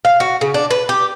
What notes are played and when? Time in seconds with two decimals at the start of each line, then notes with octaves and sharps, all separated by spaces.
0.05 F5
0.20 F#4
0.41 C#3
0.54 D4
0.71 B4
0.89 G4